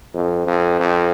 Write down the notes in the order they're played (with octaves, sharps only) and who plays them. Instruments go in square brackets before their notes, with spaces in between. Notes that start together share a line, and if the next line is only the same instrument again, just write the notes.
[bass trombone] F2
F2
F2